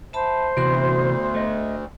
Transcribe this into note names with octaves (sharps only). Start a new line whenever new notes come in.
C5 E5 A5 B5
D2 C3 E3 B3 F#4 C6
A3 D#5